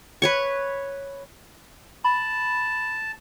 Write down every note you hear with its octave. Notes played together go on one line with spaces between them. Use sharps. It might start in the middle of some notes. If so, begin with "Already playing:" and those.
B4 C#5 C#6
A5 B5